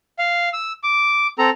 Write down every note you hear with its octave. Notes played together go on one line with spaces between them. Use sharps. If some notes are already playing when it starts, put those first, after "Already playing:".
F5
E6
D6
C4 A4 A#5